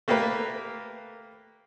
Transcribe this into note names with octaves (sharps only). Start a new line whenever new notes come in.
A3 A#3 G4 A#4 B4